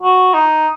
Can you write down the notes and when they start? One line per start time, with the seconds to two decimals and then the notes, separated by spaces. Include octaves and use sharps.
0.03 F#4
0.34 D#4